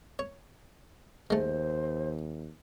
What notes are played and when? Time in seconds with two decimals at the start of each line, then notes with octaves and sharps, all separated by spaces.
0.19 C#5
1.30 D#2 G#3 A3 C5